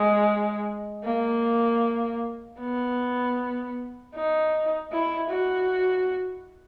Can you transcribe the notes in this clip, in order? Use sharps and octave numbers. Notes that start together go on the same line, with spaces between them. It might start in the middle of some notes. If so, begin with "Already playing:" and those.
Already playing: G#3
A#3
B3
D#4
E4
F#4